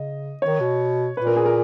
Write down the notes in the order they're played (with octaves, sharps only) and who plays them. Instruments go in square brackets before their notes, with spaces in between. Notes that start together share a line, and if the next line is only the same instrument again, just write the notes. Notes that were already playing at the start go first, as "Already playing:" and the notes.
Already playing: [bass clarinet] C#3 [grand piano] D#5
[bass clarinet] D#3 [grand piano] C#5
[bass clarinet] B2
[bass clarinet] A#2 [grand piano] B4
[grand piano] A#4
G#4
A#4